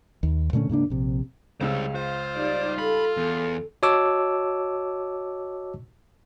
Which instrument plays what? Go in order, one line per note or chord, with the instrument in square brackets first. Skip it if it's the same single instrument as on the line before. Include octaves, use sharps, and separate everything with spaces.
[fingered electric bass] D#2
A#2 D3 A3 C#4
G#2 C#3 A#3 D4
A#1 C3
[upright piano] C#2 C#3 E6 [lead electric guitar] G3 C5
[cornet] F4 [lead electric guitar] C5
[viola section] G3 D#4 D5
[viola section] A4 [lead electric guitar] B5
[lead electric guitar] E2
[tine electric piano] F#4 C#5 D#5 A5 D6 E6